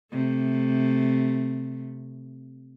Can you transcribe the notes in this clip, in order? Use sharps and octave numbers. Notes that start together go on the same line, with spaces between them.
C3 A3